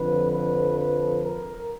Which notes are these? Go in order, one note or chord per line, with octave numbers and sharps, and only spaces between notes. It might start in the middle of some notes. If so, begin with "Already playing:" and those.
Already playing: F2 D3 F3 B4
B4
B4
A#4